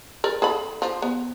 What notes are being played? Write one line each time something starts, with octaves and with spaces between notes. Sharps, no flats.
A#4 D5
G#4 A4 B5
F3
B3